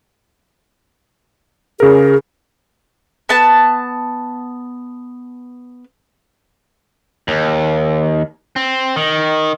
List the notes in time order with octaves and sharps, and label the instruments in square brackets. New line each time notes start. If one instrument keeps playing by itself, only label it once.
[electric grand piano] C#3 A#4 [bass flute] G#4
[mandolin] B3 A5
[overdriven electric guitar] D#2
C4
D#3